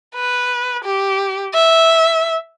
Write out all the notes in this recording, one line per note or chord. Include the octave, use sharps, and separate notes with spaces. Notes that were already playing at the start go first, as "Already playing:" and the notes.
B4
G4
E5